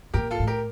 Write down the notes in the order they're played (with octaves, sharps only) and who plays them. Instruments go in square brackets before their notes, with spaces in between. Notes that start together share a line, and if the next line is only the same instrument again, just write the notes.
[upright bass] A#2 [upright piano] G4 A#4
[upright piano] F4 A4
[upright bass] A2
[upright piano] G4 A#4